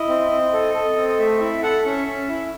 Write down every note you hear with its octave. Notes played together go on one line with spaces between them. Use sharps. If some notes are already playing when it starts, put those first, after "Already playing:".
Already playing: E4 D#5
C4
C4
A4
A4
C4
D#5
A3 E5
E4 E5
A4 F#5
C#4 E5
C#4
E4